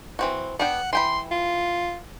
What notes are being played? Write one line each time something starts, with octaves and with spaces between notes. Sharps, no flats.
E3 C4 F#4
B3 D4 F#5 G5
E3 G5 B5 C6
F4